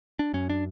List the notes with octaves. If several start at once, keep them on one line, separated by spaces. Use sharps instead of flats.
D4
F#2 C#4
D4